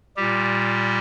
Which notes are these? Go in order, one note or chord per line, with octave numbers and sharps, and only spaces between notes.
A#2 G3 G4